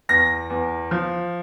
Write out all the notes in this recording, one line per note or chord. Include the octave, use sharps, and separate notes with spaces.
E2 A#6
E2
F3